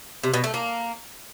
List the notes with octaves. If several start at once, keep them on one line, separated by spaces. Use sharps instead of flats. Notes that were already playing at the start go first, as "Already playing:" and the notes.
C3
B2
A3
A#3